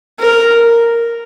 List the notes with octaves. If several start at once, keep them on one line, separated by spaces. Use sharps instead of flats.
A#4